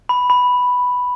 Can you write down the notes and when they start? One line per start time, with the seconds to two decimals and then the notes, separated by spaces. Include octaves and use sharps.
0.09 B5
0.30 B5